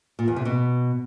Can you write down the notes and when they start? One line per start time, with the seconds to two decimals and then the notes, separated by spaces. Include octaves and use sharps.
0.19 A#2
0.28 E2
0.36 C3
0.45 B2